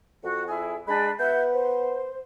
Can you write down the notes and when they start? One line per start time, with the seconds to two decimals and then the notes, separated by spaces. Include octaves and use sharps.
0.24 F2 F#4
0.47 E4 G#4
0.87 G#3 D4 G#5 B5
1.20 B3 F#4 E5 G6
1.52 C5